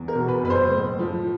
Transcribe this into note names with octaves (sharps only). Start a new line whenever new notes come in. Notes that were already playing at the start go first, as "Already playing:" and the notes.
Already playing: E2
A#4
B2
B4
F#1 B4
C5
A2
F3